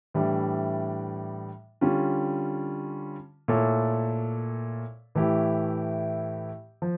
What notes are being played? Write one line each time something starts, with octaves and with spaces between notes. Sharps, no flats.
A2 E3 G3 D4
D3 G3 C#4 F4
A#2 A3 E4 A4 C#5
A2 E3 A3 E4 G4
F3